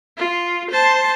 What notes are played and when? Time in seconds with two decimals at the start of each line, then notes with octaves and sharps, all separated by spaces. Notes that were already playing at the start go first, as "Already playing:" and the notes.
0.18 F4
0.71 C5 A5